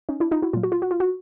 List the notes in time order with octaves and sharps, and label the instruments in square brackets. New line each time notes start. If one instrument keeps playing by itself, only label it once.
[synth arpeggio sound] C#4 D#4
D4 E4
D#4 F4
E4 F#4
A#2 F#3 F4
F#4
F4
F#4
F4
F#4